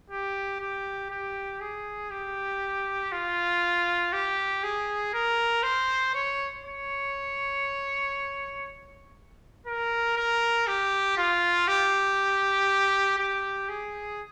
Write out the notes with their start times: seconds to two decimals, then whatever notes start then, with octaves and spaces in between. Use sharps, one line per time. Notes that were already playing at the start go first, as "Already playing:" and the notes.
0.10 G4
0.60 G4
1.10 G4
1.61 G#4
2.11 G4
3.12 F4
4.13 G4
4.63 G#4
5.14 A#4
5.63 C5
6.15 C#5
6.65 C#5
9.66 A#4
10.17 A#4
10.67 G4
11.17 F4
11.68 G4
13.18 G4
13.69 G#4